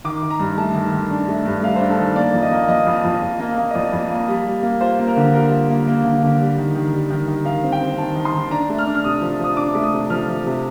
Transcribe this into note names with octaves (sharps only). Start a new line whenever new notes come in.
D#3 D6
D#3
A#5
G2
A3 A5
D#3
D#3
D4
A3
G2
A3 F5
D4 C5
A4
D#3
A#3 D5
F2
D#5
A#3
F2 D#5
F2
F2
F2
A#3
A#3
D#5
F2 D5
F2
A#3
G3
G3
A#3
F4 C5
A#3
A#4
D3
G3 A#4
F4
A#3
A#3
D3
D3
G3
D#3
D#3
G3
D#3
D#3
D#3 F5
C4
G5
C4
D#3 A5
D#3
C6
D#3
D4 A#5
A3
F6
D4
F6
C3 D#6
F3
F3 D#6
D4 D6
A3
D#6
C3
F3 F6
F3
C3